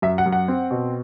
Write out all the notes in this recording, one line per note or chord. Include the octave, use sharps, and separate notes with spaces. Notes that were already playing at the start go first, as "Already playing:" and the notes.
F#2 E5
F#5
F#2
F#5
C4
B2